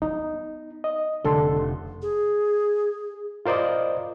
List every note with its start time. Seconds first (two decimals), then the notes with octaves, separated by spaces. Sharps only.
0.02 B3 D#4
0.84 D#5
1.25 F1 D3 A4 C6
2.02 G#4
3.46 F4 A#4 C5 D5 D#5